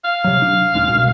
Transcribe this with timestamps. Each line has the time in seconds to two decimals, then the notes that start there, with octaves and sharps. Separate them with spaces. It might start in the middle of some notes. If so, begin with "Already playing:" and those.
0.04 F5
0.24 C3 F#3
0.42 D4
0.74 D#1 G#3 D4
0.89 C2 B2